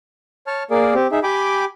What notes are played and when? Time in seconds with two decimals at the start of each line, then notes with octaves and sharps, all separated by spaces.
0.47 C#5 A5 F6
0.71 A#3 G#4 A#4 D5
0.94 C4 G4
1.12 D#4 G#4 E5
1.23 G4 G5 G#5 B5 D6